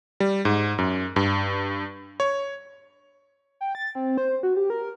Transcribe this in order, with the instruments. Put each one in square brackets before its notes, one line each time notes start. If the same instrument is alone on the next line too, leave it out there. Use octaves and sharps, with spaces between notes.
[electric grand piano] G3
G#2
F#2
G2
C#5
[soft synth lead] G5
A6
C4
C5
F#4
G4
A#4